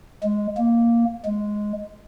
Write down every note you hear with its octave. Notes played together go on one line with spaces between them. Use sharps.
G#3
A#3
G#3